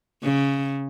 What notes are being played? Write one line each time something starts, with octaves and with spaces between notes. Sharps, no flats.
C#3